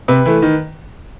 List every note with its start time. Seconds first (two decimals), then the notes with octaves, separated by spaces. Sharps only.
0.08 C3 B4
0.26 E3 A3
0.42 D#3